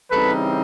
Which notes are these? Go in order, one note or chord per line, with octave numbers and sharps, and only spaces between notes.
C#3 E3 G3 C4 D#4 A4 B4